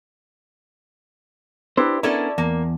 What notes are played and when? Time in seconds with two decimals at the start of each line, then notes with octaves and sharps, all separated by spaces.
1.77 D4 E4 G4 B4 C5
2.03 B3 C#4 D4 E4 A4 A#4 D5
2.38 E2 A#3